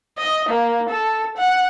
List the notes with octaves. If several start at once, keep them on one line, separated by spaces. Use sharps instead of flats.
D#5
A#3
A4
F#5